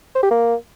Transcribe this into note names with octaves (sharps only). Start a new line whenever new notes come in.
C5
G4
A#3